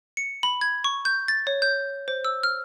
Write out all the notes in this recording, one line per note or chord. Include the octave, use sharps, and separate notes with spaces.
C#7
B5
G#6
C#6
G6
A6
C#5
G6
C5
E6
F6